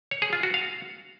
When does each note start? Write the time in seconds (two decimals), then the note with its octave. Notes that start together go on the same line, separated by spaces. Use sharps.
0.11 C#5
0.22 G#4
0.33 F4
0.43 F#4
0.54 F5